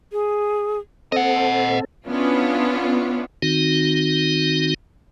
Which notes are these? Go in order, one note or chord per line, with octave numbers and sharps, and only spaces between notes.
G#4
C4 A4 D#5 F#5
B3 C#4 D4 E4 F4
D#3 C4 D#4 F#4